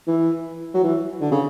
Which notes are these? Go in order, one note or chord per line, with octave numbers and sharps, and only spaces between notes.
E3
F#3
E3
D3
C#3